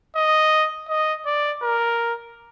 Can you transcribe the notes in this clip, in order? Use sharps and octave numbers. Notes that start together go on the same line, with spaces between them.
D#5
D#5
D5
A#4